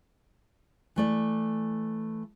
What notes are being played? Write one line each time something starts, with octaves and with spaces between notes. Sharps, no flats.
E3 A3 D5